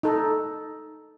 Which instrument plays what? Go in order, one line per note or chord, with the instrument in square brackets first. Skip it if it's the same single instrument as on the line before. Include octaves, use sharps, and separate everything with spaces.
[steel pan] D#4 A4